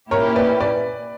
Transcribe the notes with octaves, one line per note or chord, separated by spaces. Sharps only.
A#2 A#3 C#4 E4 G4 A#4 C#5
B4 D5
B4 D5